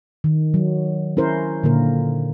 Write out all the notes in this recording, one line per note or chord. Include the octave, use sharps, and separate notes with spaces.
D#3
F#3
C#4 E4 A#4 C5
A#2 D3 A#3 A#4